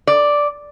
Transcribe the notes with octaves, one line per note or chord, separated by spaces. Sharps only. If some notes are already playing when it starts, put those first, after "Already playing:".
D5